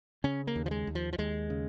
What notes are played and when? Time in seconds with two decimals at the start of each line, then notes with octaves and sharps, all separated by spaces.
0.24 C#3 C#4
0.47 A#3
0.56 D#2
0.66 F3
0.71 G#3
0.87 D#2
0.95 F3
1.13 F3
1.18 D#2 G#3
1.50 C#3